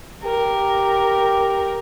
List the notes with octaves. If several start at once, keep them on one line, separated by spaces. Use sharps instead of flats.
G4 A#4